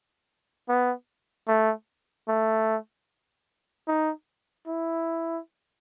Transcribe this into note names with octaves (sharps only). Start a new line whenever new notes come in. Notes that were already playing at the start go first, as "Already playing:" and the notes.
B3
A3
A3
D#4
E4